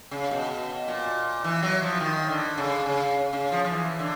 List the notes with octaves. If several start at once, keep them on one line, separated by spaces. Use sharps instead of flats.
C#3
B2
A#2
E3
F#3
F3
D#3
D3
C#3
C#3
C#3
F3
F3
E3
D3